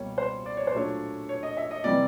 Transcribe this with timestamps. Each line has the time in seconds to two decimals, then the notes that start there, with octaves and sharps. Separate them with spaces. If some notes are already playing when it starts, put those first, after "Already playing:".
Already playing: C#2 B2 G3 A#3 C#5
0.18 C5
0.46 D5
0.57 C#5
0.67 C5
0.74 A#2 F#3 A3 D4 C#5
1.29 C#5
1.43 D#5
1.57 E5
1.71 D#5
1.84 C3 E3 G3 C4 D5